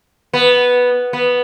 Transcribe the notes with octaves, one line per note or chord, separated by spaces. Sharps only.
B3
B3